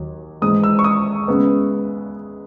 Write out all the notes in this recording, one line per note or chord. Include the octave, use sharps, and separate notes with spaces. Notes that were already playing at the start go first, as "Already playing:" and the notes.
Already playing: D#2 F#3
G#2 E3 G#3 D#6
E6
C#6
D#6
C#3 G#3 B3